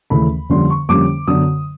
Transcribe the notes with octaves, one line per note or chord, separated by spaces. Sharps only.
D#2 C#3 E3 A3 B5
F2 D3 G3 A#3 C#4 C6
C#6
F2 D3 G3 A#3 C#4 D6
F#2 D3 F#3 B3 D#6